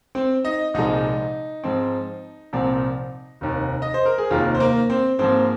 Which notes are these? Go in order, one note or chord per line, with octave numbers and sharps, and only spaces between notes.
C4 C5
D#4 D#5
C2 A#2 F3 G#3 D#4
G#2 F3 C4
C2 A#2 F3 C4
F1 D#2 D#3
D#5
C5
A#4
G#4
F1 D#2 D#3 A#3 F4
C5
A#3 A#4
C4 C5
G#2 F3 A#3 C4 C5